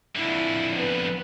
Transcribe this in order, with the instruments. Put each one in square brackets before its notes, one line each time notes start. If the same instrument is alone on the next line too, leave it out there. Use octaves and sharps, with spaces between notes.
[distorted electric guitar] F2 D3 [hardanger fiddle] E4
[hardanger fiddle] B3